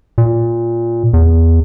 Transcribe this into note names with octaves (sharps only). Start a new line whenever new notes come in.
A#2
E2